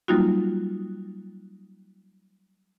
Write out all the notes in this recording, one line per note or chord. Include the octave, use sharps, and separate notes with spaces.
F#3 G3 A#3 D#4 F4 F#4